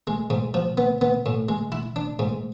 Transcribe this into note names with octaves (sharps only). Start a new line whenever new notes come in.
G#3
G#2
F3
B3
B3
A2
G#3
E4
D4
G#2